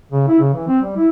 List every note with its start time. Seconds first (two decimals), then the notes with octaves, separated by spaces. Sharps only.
0.11 C#3
0.28 E4
0.39 C#3
0.54 E3
0.68 C4
0.82 G3
0.97 E4